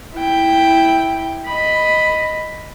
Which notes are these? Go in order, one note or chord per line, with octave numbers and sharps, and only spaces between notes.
E4 G5
D#5 B5